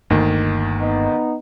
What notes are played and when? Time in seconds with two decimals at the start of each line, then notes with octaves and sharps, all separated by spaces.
0.10 G1 D2 G2 D#3 A#3
0.80 B3 D#4